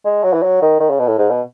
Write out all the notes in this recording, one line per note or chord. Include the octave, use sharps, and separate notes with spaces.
G#3
F#3
E3
F#3
D#3
D#3
C#3
B2
A2
G#2
B2